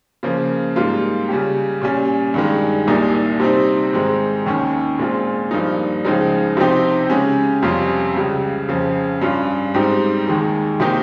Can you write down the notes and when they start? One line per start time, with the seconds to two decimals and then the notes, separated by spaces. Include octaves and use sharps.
0.23 C#3 F3 A#3
0.76 G#2 G3 A#3 F4
1.29 C#3 G3 C#4 G4
1.82 A#2 G3 C#4
2.34 G2 D#3 G#3
2.87 C2 A#2 G3 A#3 D#4
3.40 C3 G3 C4 D#4
3.93 G#2 D#3 G#3 C4
4.46 D#2 D#3 A#3 C#4
4.98 A#2 G#3 C4 F4
5.51 G2 F3 A#3 D#4
6.05 C#2 C#3 F3 G#3 D#4
6.57 C3 F3 C4 D#4 G4
7.10 C#3 G#3 C#4 G4
7.62 F2 C3 G3 C#4 F4
8.16 C#2 C#3 G3
8.69 F2 C#3 F3
9.21 G2 G3 C#4 F4
9.74 G#2 G3 C4 D#4 G4
10.27 D#2 D#3 G#3
10.80 C3 D#3 A#3 D#4 G4